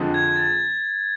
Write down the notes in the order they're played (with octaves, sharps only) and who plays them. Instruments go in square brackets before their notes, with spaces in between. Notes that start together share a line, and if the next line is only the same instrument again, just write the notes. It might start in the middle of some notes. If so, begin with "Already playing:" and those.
Already playing: [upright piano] F2 D3 F3 G#3 C4
[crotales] G#6
A6